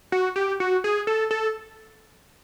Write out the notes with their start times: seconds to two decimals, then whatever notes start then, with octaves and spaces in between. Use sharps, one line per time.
0.12 F#4
0.36 G4
0.60 F#4
0.84 G#4
1.07 A4
1.31 A4